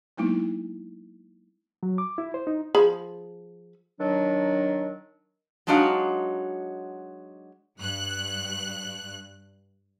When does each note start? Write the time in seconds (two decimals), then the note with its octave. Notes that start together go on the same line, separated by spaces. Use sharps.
0.18 F#3 G#3 A#3 B3 D#4 E4
1.83 F#3
1.98 D6
2.18 E4
2.34 C5
2.47 D#4
2.75 F3 G#4 B5
4.00 D#3 F#3 D4
5.67 F#3 G#3 D4 D#4 F#4 F5
7.78 G2 F#6